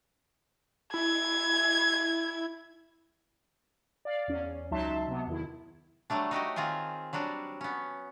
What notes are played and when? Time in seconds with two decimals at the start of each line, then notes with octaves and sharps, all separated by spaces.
0.94 E4 G#6
4.05 D5 F5
4.28 E2 C#4
4.71 C#2 F#3 D#4 E5 A5 C6
5.08 C3 F#3 B3
5.27 E2 D#3 E4
6.10 F#3 G3 A3 D4
6.31 D#4 F#4 G4 D#5
6.56 D#3 C4 F4 G#4 G#5
7.13 F#3 G3 D4 F#4
7.61 B3 C#4